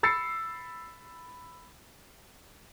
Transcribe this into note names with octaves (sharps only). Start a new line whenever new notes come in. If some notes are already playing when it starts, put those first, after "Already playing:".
B5 E6 A6 C7 C#7